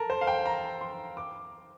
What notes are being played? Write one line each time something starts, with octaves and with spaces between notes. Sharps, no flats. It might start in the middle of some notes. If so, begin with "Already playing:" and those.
Already playing: A4 A#4
C5
F5
G5
A#5
C6
D6